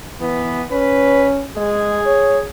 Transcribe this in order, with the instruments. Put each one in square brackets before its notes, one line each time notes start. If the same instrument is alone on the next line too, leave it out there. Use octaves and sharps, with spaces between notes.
[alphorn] E3 [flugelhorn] B3
[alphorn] C#4 [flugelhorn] B4
[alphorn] G#3 [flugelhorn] G#4
[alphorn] C#5